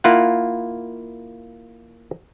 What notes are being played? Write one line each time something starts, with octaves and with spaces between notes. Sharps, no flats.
A#3 E4 F4 F#5